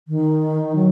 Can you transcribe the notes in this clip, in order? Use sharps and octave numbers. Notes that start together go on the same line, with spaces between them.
D#3
F#3